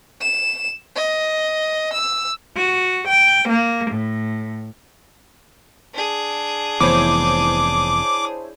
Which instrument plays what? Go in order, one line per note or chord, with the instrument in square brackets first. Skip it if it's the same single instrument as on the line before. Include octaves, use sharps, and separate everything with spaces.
[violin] E7
D#5
E6
[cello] F#4
G5
A#3
A2
[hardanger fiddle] D4 G#4
[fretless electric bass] F1 E3 B3 [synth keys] E4 C5 C#5 [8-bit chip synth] D6